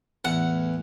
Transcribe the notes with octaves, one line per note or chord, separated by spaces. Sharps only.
E2 A2 F#5